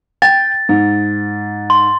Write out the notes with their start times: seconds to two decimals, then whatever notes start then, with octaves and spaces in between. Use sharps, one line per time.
0.22 G5 A6
0.69 G#2
1.70 C6